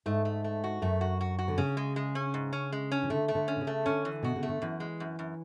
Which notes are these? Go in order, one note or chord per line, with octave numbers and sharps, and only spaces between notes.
G#2 A3
A3
A3
F#4
F#2 A3
F#4
F#4
F#4
D3
C#3 C#4
G#3
G#3
C#4
G#2
C#4
G#3
C#4
E3
D3 A3
A3
D3
C#4
B2
C#3
A3
D3 C#4
E3
B2 F#4
C#3
A3
D3
F#2 E3
G#3
F#2
F#2